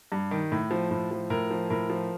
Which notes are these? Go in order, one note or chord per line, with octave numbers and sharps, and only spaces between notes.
G2
D#3
A2
F3
A2
F3
A2 A#4
F3
A2 A#4
F3